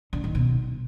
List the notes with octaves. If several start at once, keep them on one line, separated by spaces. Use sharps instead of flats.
D3
D#3
B2